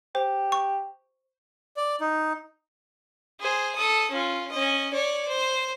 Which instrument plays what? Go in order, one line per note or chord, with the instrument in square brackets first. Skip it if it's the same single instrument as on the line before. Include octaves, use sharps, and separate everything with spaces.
[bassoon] G4 [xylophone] C5
[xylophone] C#6
[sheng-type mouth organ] D5
D#4
[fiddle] G#4 C5
A4 D#6
C#4 F4
C#4 D#5
C#5 D5
C5